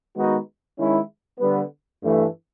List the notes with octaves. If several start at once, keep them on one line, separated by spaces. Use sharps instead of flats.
D#3 G#3 B3 D#4 F#4
D#3 G#3 C#4 E4
D3 G3 B3
G2 E3 A3